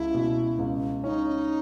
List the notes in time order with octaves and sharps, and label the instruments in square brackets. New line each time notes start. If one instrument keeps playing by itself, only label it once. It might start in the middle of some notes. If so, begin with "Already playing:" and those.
Already playing: [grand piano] C#2 [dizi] E4
[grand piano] B2
C#2
[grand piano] C#4 [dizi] E4
[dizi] D#4